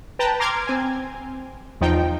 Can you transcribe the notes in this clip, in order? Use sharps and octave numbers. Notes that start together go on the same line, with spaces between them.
B4 G5 A5 A#5
A#5 C6 D6 F6 G#6
C4 G#5
E2 F3 D#4 G5